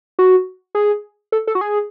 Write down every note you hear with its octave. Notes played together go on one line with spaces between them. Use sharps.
F#4
G#4
A4
A4
F#4
G#4